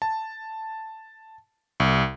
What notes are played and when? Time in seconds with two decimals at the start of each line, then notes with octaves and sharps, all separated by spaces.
0.02 A5
1.80 C2